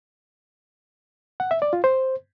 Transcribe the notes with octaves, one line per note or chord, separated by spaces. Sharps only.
F#5
E5
D5
F4
C5